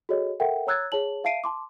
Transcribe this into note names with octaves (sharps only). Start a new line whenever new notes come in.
F#4 G#4 A4 C#5 D#5
A4 A#4 E5 F#5 G5
C#5 A#5 E6 F#6 G#6 A6
G#4 C#5 A5 F#7
E5 F5 A5 C7 D7 D#7
A5 C6 D6